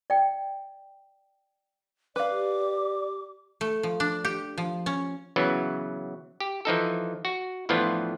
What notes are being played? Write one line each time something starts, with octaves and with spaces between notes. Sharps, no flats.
D5 G5
B4 D5 F5 D6
G4
A3
F3
D4
G4
F3
C#4
C#3 E3 F#3 B3
G4
E3 F3 D#4 A4
F#4
A2 E3 F3 B3 D4 F4